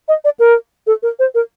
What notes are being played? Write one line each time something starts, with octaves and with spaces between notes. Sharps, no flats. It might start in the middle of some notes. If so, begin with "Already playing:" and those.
D#5
D5
A#4
A4
A#4
C5
A#4